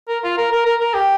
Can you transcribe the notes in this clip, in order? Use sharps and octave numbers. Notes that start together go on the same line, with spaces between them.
A#4
F4
A#4
A#4
A#4
A#4
G4